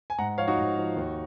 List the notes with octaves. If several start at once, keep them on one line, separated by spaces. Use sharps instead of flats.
G#5
G#2 F#5 A#5
F3 C#5 F5
D#4 F#4
G#2
F3
D#2